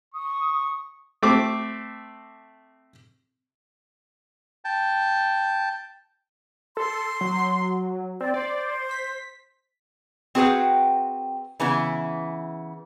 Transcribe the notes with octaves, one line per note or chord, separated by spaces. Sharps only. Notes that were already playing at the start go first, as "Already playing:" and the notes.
C#6 D#6
A3 C4 D6
G5 A5
A4 C6
F#3
C4 D5
C5 D5
B6
C4 F#4 G#4 B4 F#5 G5
C#3 E3 B3 E4